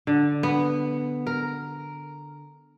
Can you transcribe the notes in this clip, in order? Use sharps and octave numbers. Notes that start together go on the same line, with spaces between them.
D3
B3
A#4